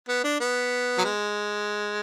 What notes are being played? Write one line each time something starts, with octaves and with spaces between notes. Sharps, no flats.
B3
D4
B3
F#3
G#3